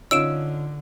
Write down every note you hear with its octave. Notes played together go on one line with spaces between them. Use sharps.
D3 C#4 D#4 F4 E6 D7 E7